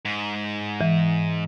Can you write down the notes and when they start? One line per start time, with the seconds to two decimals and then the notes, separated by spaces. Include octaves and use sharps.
0.05 G#2
0.81 E3